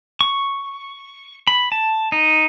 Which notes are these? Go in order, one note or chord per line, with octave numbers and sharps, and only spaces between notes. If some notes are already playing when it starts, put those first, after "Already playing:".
C#6
B5
A5
D#4